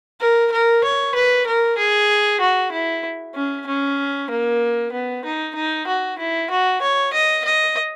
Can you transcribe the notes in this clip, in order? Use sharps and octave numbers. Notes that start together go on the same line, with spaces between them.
A#4
A#4
C#5
B4
A#4
G#4
F#4
E4
C#4
C#4
A#3
B3
D#4
D#4
F#4
E4
F#4
C#5
D#5
D#5